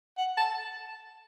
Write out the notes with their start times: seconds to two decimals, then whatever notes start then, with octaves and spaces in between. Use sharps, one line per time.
0.18 F#5
0.37 A5